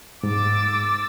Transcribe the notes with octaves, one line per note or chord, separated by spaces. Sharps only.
G#2 D6 E6 A6